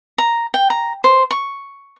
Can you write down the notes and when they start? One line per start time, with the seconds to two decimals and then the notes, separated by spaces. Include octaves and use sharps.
0.18 A#5
0.54 G5
0.70 A#5
1.04 C5
1.31 C#6